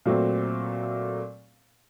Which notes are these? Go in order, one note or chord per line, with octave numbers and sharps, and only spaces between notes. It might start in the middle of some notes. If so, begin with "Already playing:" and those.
A#2 F#3 A3 C4